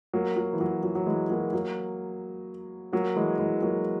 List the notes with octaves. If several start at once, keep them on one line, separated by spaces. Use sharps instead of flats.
F#3 A#3
F#3
E3
F#3
F#3
F#3
E3 G#3
F#3 A#3
F#3 A#3
F#3 A#3
E3 G#3
E3 G#3
F#3 A#3